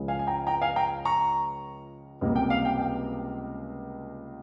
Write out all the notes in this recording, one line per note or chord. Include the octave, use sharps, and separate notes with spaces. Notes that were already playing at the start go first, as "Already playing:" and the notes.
Already playing: C#2 C#3 F3 G#3
F5 G#5
G#5
G5 A#5
G5 A#5
F5 G#5
G5 A#5
A#5 C#6
C#2 C3 G3 A#3
G5
F5
G5
G5